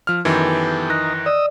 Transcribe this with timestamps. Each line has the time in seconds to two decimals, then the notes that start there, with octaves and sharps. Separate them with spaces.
0.07 F3 F6
0.25 F#2 D#3 E3 B3 G4 A4
0.90 D#4 A#4 F#6 A#6
1.26 D5 D#5 D#6 E6